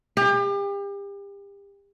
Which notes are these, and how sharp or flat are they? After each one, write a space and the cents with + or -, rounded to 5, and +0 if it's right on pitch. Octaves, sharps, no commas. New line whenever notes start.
G4 +35